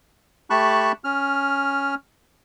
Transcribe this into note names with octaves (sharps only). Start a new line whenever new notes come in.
A3 G4 A5 B5 C#6 F#6
C#4 F6